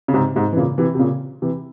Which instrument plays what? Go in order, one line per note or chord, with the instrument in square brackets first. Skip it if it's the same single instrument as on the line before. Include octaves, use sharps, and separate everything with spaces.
[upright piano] C#3
G#2 C3
G#2 C3
E3
A#2 C#3
C3 E3
C3
A#2 C#3
C3 E3